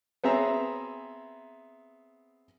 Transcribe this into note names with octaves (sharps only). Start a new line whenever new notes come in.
B3 C4 G#4 E5 A#5